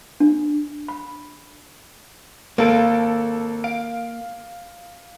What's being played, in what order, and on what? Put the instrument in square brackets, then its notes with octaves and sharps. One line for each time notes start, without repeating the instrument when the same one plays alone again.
[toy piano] D4
B5
[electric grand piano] G#1 A4 D7 [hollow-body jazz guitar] A#3
[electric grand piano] F5 D7